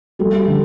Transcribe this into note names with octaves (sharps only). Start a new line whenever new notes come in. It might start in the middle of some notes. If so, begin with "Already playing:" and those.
G3 A4
D3